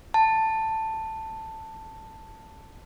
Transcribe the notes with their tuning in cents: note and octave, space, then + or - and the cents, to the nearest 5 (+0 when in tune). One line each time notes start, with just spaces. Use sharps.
A5 +10